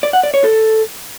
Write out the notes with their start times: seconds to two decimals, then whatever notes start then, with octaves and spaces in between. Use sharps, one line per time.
0.03 D5
0.13 F#5
0.23 D5
0.34 C#5
0.44 A4